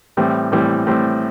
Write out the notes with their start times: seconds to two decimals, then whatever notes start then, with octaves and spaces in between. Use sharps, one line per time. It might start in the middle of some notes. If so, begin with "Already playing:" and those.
0.17 A2 E3 G3 C4
0.52 A2 E3 G3 C4
0.87 A2 E3 G3 C4